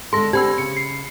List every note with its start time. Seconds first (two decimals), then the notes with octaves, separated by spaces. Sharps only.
0.13 D3 G#3 A4 C6 A#6
0.33 D3 C4 G4 B5 E6
0.58 C#3 C#7
0.77 C7